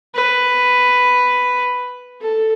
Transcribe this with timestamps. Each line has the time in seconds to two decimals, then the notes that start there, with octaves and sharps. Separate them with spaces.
0.15 B4
2.21 A4